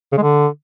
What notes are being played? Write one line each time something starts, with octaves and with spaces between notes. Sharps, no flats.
C#3
G#3
D3